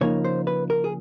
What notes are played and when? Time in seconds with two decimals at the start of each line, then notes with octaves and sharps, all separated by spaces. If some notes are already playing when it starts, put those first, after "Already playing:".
0.01 C#3 F3 A#3 D#4 C#5
0.25 C5
0.47 B4
0.70 A#4
0.84 G#4